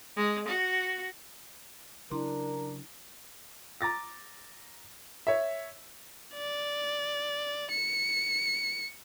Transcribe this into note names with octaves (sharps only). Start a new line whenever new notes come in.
G#3
F#4
C#3 F#3 D4 E4 A#4 C6
A#5 D6 A6 A#6
C#5 E5
D5
C#7